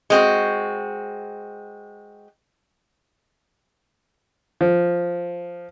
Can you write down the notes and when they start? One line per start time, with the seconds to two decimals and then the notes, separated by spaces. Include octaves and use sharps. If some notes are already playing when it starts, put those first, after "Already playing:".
0.10 G#3 C4 F#4
4.61 F3